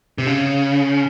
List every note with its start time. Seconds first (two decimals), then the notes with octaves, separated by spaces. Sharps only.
0.18 C3
0.27 C#3